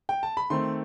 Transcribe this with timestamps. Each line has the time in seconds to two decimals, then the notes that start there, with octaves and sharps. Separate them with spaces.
0.09 G5
0.23 A5
0.37 B5
0.50 D#3 A3 C4 C6